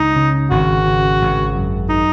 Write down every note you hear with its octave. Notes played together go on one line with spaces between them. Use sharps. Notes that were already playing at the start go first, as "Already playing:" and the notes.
Already playing: C#2 D#4
C#3
G#1 F#4
C#3
G#1
F#2
D#4